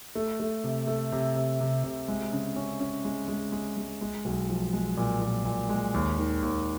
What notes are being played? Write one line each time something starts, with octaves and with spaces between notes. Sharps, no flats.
A3
A3
C3
A3
C3
C3
C3
C3
G#3
C#3
C#4
C#4
G#3
G#3
G#3
G#3
G#3
B1
F3
G#3
A#2
A#2
A#2
G#3
D#2
D#3
D#2